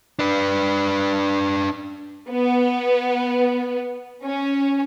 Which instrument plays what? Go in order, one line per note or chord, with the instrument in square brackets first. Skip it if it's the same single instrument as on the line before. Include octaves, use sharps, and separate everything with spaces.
[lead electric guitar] D4 B4
[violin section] B3
C#4